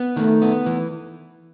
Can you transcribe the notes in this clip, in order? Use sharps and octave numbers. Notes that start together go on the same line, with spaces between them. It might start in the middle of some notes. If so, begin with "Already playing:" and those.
Already playing: B3
D#3 A3
B3
E3